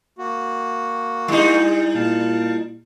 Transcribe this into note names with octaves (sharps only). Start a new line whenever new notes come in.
A#3 F#4
G3 D#4 E4
A#2 F5 A5